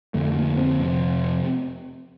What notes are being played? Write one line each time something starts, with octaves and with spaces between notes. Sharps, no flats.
F2 D3 A3
A#3
C4
F2 C3